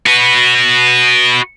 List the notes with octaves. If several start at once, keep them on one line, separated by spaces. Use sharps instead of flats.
F#4 B4